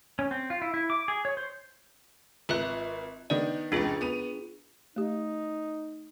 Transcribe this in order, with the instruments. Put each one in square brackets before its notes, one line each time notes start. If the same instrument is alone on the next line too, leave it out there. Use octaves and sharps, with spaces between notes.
[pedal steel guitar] C#4
C4
F4
E4
E4
D6
G#4
C#5
C5
[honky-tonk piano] G#1 F#6 [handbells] F4 B4 E5
[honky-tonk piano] D#3 B3 D4 [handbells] D5
[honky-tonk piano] F1 C#2 [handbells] D4 F4 G#4
[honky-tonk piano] B3 D#7 F7
[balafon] A3 G4 [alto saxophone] D#4